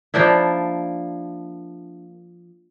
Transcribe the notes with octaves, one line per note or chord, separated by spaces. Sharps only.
F3 A#3 D4 E4